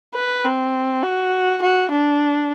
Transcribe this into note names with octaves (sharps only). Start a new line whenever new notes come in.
B4
C4
F#4
F#4
D4